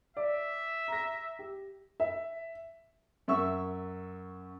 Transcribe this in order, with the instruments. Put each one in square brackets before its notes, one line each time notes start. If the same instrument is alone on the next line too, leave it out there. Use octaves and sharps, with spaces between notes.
[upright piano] D5 [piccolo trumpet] E5
[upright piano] A#5 A#6
G4
E5
[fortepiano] F#2 E5 C#6 E6